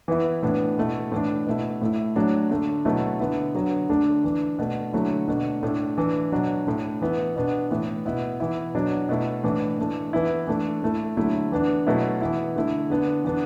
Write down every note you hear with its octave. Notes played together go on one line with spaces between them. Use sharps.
E3 B3 E4
A2 E3 B3 D4
B2 A3 E4
A2 E3 D4
B2 A3 E4
A2 A3 E4
A2 F#3 A3 D4
D3 A3 D4
B2 F#3 A3 E4
D3 B3 E4
D3 F#3 B3
D3 A3 D4
E3 D4
B2 A3 D4
D3 F#3 A3 E4
B2 A3 D4
A2 A3 D4
E3 D4
B2 F#3 D4
A2 A3 D4
E3 B3 E4
B2 B3 D4
A2 E3 B3 E4
B2 B3 E4
E3 B3 E4
B2 F#3 D4
B2 A3 E4
A2 E3 D4
E3 A3 D4
E3 B3 E4
E3 A3 D4
A2 A3 E4
D3 F#3 A3 E4
E3 B3 D4
B2 F#3 A3 E4
E3 B3 E4
D3 A3 E4
D3 B3 D4
E3 B3 D4